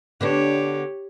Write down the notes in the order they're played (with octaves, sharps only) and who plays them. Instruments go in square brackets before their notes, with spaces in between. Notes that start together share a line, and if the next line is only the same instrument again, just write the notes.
[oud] D3 B3 D4 [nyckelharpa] G4 C#5